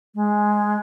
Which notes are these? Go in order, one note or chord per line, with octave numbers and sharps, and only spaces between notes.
G#3